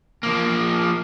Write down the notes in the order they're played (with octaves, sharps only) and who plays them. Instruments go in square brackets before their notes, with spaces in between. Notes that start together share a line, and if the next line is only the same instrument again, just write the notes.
[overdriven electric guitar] F3 A#3